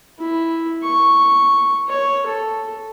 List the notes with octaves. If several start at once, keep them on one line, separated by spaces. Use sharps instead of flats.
E4
C#6
C#5
A4